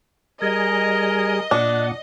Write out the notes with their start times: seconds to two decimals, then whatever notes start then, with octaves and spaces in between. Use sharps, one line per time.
0.42 G3 G#4 A#4 D#5 G#5
1.51 A#2 D4 F#5